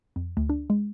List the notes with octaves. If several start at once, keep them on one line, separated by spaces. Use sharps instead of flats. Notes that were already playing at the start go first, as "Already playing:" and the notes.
F2
D2
D4
G#3